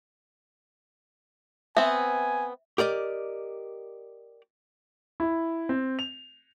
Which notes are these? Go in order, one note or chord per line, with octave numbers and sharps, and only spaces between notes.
B3 C4 E5 G#5
G4 A#4 D5 D#5
E4
C4
F7